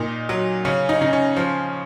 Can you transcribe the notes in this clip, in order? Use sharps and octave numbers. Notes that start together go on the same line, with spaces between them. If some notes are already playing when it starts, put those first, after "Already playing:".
Already playing: A#2 D#4
F#3
C#3 C#4
D#4
C#3 D#4
C#4
F3